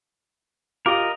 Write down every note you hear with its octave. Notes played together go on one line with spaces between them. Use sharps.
F4 G4 A#4 D#5 D6